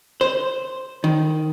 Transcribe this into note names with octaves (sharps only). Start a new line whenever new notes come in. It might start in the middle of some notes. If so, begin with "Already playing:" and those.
C5
D#3